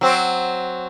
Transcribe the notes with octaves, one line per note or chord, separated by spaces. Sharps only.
F#3 C4